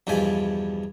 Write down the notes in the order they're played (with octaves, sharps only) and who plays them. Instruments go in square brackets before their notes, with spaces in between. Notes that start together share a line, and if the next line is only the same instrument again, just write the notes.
[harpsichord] E2 G2 B2 F3 G#5 B5